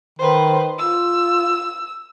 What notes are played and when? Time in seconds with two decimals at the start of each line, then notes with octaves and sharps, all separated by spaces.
0.19 D#3 B4 C5
0.79 F4 E6